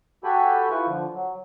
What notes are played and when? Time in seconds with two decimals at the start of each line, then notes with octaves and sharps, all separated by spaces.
0.24 F#4 G4 A4 G5 G#5 B5
0.70 E4 F4 B4 C#6
0.87 D3 F3
1.14 F#3